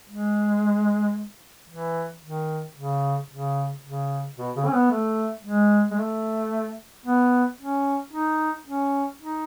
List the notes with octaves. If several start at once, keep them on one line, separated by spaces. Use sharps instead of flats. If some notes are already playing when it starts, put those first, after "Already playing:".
G#3
E3
D#3
C#3
C#3
C#3
B2
C#3
C#4
B3
A3
G#3
G#3
A3
B3
C#4
D#4
C#4
D#4